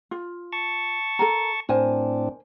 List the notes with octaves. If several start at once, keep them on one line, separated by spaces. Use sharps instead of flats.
F4
A5 C#6
A4 A#4 A#5
A2 C4 D4 A#4 C5 G#5